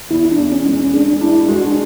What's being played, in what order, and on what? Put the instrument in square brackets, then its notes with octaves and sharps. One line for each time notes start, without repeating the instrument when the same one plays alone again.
[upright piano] E2 [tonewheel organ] E4
[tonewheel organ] D4
[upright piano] E2
[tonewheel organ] C#4
[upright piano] G#3
[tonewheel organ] C#4
C#4
[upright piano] G#3 [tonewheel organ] D4
[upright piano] D4 [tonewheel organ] E4
[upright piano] G#3 [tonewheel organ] F#4
[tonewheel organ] D4